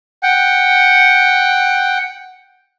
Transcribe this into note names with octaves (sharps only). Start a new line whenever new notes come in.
F#5 G5